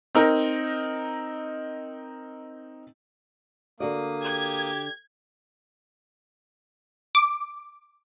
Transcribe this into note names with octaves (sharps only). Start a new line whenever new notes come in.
C4 D#4 A#4
D3 A#3 F#4 D5 D#6
G4 G#6
D6